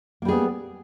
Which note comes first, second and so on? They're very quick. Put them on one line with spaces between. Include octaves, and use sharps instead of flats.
A#3 G3 G#4 B3